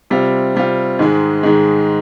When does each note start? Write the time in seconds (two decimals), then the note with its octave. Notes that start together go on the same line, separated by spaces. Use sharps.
0.10 C3 G3 C4 F4
0.55 C3 G3 C4 F4
0.99 G#2 D#3 G#3
1.43 G#2 D#3 G#3